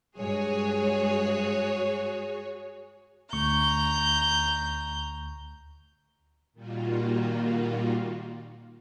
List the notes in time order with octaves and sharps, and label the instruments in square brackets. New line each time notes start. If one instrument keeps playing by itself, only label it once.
[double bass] G2 G#3 [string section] F#4 G#4 C#5
[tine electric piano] D2 C#6 [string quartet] A#5 G6
[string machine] A#2 D#3 G3 A#3 F4 F#4